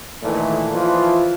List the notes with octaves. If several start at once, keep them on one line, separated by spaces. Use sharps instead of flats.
A#2 D#3 E3 A3
E3 F3 F4